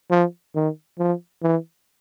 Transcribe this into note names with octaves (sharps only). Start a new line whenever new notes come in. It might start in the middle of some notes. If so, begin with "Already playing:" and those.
F3
D#3
F3
E3